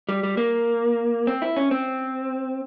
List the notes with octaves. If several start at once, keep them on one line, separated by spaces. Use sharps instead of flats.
G3
G3
A#3
C4
E4
C#4
C4